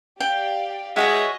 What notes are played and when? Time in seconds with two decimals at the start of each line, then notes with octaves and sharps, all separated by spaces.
0.20 G4 D5 F5 G5
0.96 G#3 F#4 G#4 C#5 D#5 E5